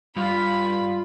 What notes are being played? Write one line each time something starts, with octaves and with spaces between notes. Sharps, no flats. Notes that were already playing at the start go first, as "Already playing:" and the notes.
G2 G3 F4 F5 B5